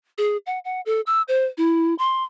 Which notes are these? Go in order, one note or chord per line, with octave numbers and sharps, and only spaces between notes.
G#4
F#5
F#5
A4
E6
C5
E4
C6